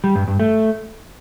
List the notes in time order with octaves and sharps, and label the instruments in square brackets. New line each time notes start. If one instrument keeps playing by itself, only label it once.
[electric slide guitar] G3
G2
G2
A3